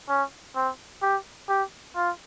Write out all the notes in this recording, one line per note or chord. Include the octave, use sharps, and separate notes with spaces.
C#4
C4
G4
G4
F4